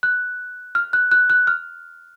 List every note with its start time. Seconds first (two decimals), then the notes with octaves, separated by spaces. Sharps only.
0.03 F#6
0.75 F6
0.93 F#6
1.12 F#6
1.30 F#6
1.47 F6